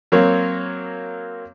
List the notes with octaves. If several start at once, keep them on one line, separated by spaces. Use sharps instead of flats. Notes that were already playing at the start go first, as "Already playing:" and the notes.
F#3 A#3 C4 C#5